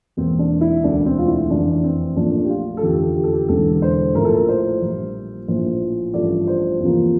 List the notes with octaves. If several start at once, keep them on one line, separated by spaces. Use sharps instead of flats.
E1 E2 E3 A#3 C4
D4
E4
E1 D2 D3 A3 D4
C4
F4
E4
F1 E2 E3 D4
C4
A#1 A#2 F3 A3 D4
G4
F4
A4
F1 E2 D3 F3 A3 G4
G4
A4
G4
E1 E2 D3 A4
C5
A#1 A2 F3 A3 A#4
A4
A#4
C5
A#1 A#2 G3
A#1 A2 F3 C5
A1 G2 F3 A3 D5
C5
E2 C3 F3 A#3